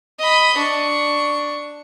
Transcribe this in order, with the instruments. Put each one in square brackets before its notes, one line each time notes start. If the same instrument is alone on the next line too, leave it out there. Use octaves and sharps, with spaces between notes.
[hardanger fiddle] D#5 B5
D4 C#6